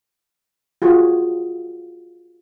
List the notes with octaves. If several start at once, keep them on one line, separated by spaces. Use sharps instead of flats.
F4 F#4 G#4